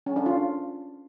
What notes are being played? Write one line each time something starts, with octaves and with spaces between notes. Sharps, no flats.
C#4
D4
F4